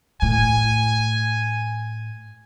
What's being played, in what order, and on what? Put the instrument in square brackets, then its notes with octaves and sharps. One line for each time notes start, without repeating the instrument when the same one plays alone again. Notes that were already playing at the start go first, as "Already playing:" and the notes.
[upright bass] A2 [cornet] G#5